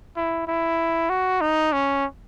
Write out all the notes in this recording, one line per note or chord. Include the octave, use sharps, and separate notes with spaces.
E4
E4
F#4
D#4
C#4